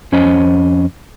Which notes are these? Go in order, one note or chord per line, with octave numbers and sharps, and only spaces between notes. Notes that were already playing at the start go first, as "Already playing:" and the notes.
F2 C#4 C5 D#5